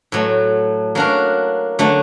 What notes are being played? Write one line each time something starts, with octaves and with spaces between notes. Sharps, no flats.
A2 F#3 A3
F#3 A#3 D4 F#4 A#4
D3 F#3 A3